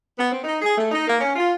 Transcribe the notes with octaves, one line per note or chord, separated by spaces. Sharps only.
B3
C4
D#4
G#4
A3
D#4
A#3
C#4
F4